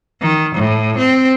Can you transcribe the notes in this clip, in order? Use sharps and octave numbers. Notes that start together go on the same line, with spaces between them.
D#3
A2
C4